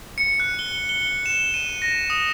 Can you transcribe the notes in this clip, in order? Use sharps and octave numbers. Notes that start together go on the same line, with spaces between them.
C#7
F#6
G7
G7
E7
D#7
A#6
D#6